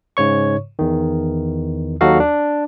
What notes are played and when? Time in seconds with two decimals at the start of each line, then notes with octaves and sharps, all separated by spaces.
0.17 G#2 C#3 C#5 C#6
0.79 E2 D#3
2.01 D#2 F#3 D#4 F#4 A4 F5
2.20 D4